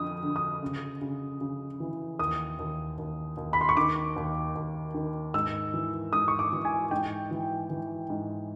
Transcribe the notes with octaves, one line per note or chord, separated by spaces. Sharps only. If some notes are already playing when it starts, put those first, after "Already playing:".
Already playing: F2 D3 D#6
D3
D#6
C#3
C#3
C#3
E3
D#2 D#6
D#2
D#2
D#2
B5
C6
C#6
D#3 D6
D#2
D#2
D#3
G#2 E6
E3
G#2 D#6
C#6
D6
E3
G#5
G#2 G5
E3
E3
G#2